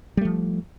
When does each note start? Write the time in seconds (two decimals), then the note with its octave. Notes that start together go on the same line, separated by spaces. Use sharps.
0.17 G3
0.21 A3
0.25 F3